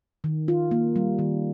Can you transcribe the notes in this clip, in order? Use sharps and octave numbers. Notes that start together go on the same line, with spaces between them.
D#3
F4
A#3
G3
D#3